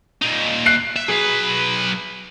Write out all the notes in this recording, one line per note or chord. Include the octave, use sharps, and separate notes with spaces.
A#2 D#4
F#6 C7 D7
E5
F#3 G#4 B4